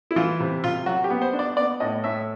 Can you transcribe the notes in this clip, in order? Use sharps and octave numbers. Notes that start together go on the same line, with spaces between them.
E4
E3 F4
C3
C3 F4
F#3 F#4
G4
B3
C5
D4
D5
B3 D5
A2 D#5
A2 E5